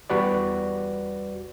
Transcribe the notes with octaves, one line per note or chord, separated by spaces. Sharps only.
E2 G3 F#4 B4 D5